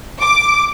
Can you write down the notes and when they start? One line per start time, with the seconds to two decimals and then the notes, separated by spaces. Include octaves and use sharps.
0.21 D6